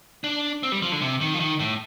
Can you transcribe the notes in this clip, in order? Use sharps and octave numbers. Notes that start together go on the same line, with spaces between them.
D4
C4
G3
F3
D3
C3
D#3
F3
D#3
A2